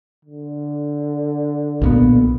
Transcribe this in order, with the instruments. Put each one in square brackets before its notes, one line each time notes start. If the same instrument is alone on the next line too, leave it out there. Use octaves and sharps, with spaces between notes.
[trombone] D3
[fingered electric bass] B1 A#2 B3